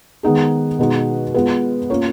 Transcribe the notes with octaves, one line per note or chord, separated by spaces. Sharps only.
D#3 G#3 B3 D#4 G#4
B2 G#3 D#4 F#4
G#3 B3 F4 B4
A#3 C#4 F4 A#4 C#5